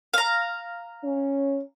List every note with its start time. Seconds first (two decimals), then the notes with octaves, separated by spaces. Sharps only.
0.14 F5 A#5
1.04 C#4